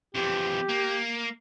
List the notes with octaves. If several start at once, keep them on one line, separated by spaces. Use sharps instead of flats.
F2 E3 G4
A#3